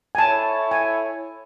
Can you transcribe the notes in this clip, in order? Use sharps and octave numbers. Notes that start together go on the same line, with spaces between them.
G#5
E4 A4 C#5 A5
G#5